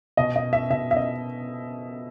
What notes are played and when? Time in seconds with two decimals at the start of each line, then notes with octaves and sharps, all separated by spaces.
0.17 B2 D#5
0.36 D#5
0.53 E5
0.70 B2 E5
0.91 E5
0.97 D#5